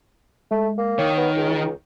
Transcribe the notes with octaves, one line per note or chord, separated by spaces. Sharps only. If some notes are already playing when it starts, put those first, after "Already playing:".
G#3 A3
A#3
D#3 C#5
B3
C#2